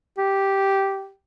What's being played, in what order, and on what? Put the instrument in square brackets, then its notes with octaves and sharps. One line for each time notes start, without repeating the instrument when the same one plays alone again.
[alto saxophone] G4